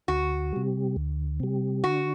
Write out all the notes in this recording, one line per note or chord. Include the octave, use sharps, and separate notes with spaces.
D2 F#4
C3 G3
D2
C3 G3
D3 F#4